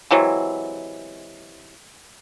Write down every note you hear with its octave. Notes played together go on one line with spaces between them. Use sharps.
C3 E3 F#3 G#3